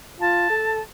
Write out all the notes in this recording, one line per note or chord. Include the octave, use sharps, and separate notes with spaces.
F4 A5
A4